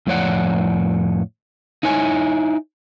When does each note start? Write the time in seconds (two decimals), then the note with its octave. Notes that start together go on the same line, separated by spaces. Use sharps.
0.07 F2 A2 F3 C#5 D5 F#5
1.83 D#4 E4 C#5 G#5